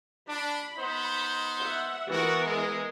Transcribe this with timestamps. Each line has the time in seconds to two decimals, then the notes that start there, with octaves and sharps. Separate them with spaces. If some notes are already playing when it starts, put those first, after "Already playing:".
0.28 D4 B5
0.78 B3 D#4 C5
1.61 E5 F#5
2.10 E3 B3 F#4 A#4
2.45 G#3